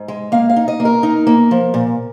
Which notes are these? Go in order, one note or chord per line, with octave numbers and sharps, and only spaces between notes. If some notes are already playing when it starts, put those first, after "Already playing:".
Already playing: G#2
G#3
A#3 F5
F5
D#4
D#5
A#3
A#4
D#4
A#3
F3
A#2